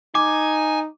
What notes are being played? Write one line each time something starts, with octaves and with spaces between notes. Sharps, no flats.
D#4 G#5 D6